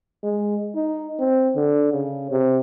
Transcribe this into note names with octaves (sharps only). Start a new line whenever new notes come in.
G#3
D#4
C4
D3
C#3
C3